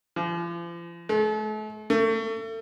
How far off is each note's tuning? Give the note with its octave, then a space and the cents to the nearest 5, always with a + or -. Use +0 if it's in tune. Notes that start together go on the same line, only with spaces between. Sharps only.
F3 -40
A3 -40
A3 +35